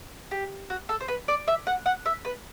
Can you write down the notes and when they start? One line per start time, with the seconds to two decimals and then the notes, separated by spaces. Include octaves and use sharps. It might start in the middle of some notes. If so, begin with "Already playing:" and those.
0.31 G4
0.70 F#4
0.89 A4
1.01 C5
1.08 B4
1.28 D5
1.48 E5
1.67 F#5
1.86 F#5
2.06 E5
2.25 B4